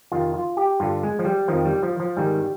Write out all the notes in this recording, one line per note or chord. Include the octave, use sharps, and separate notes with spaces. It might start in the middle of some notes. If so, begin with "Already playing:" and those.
F2 C3 D#3 F4
F4
G4
G2 D3 F4
G#3
F3
G3
F2 D#3 F3
G3
F3
F3
G#2 D#3 G3